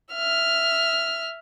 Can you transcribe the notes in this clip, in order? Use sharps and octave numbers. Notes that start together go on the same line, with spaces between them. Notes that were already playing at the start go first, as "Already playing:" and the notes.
E5 F6